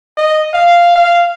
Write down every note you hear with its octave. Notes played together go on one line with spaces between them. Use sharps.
D#5
F5
F5